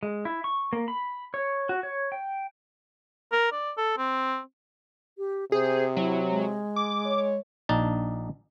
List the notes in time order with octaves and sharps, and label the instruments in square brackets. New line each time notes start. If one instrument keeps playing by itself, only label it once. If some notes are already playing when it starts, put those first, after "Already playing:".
[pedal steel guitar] G#3
E4
C#6
A#3
B5
C#5
F#4
C#5
G5
[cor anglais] A#4
D5
A4
C4
[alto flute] G4
[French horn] C3 [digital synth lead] G#4 [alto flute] C5
[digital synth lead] F#3 [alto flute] E4
[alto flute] G#3
[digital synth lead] D6
[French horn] C#5
[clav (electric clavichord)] A#1 D4 D#4 A5